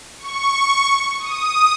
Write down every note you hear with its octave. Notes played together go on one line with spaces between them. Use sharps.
C#6
C#6
D#6